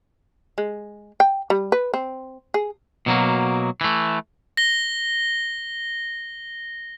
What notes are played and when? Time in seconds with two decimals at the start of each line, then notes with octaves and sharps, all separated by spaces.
0.58 G#3
1.20 G5
1.50 G3
1.72 B4
1.94 C4
2.54 G#4
3.06 B2 F#3 A#3
3.81 E3 A3
4.57 A#6 G7